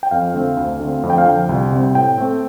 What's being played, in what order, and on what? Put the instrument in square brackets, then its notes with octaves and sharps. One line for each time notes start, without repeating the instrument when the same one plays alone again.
[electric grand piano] G5
F2 F5
D3 A3 C4
D2
D3 A3 C4
F2
G5
F5
D3 F3 G5
C2
C3 G3 C4
A2 G5
A3 C4